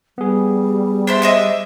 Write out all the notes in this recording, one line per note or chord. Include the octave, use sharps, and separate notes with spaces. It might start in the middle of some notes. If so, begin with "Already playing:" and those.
G3 B3 G#4
D4 C5 E5
D#5 E5 D6